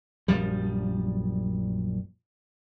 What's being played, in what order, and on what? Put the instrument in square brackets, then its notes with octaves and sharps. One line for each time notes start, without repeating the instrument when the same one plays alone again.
[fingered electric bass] A#1 F#2 F3 G3